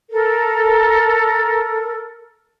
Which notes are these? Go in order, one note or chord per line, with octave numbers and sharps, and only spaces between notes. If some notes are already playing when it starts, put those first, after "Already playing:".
A4 A#4